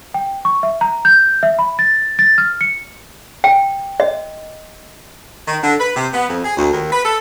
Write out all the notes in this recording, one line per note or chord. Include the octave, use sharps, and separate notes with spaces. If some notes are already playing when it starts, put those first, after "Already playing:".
G5
C#6
E5
A#5
G6
E5
B5
A6
A6
F6
C#7
G5
D#5
D#3
D3
B4
C3
B3
F2
G#4
D2
D#2
B4
A4